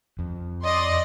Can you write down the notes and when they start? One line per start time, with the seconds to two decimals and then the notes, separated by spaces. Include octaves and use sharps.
0.19 F2
0.64 D5 D#5 C6